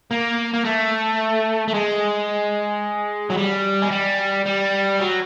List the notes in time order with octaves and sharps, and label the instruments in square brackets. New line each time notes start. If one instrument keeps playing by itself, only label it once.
[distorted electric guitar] A#3
A#3
A3
A3
G#3
F#3
G3
G#3
G3
G3
F#3